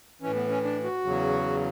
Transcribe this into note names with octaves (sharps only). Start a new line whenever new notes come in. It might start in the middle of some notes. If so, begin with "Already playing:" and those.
A2 E3 C#4
B3
C#4
D4
F#4
E2 C#3 F#3